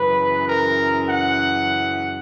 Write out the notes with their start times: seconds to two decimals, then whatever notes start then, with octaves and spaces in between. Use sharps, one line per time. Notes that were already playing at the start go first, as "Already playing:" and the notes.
Already playing: F#2 C#3 E3 B4
0.46 A#4
1.07 F#5